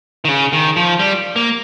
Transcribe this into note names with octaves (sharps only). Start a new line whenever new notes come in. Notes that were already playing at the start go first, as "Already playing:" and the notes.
D#3
C#3
D#3
F3
G3
A#3